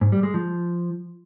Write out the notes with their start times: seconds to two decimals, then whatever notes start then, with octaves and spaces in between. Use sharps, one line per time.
0.01 G#2
0.12 G3
0.23 G#3
0.34 F3